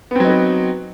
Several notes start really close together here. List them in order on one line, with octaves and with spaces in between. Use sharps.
B3 C4 F#3 D#4 B4